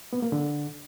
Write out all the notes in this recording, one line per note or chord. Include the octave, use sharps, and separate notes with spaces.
B3
A#3
D3